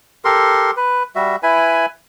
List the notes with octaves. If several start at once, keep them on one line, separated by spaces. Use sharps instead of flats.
G4 A4 A#4 C6
B4
G3 F#4 E5
E4 B4 G#5 B5